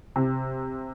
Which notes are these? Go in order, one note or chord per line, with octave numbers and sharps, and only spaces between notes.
C3